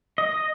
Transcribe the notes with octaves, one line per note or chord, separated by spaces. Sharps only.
D#5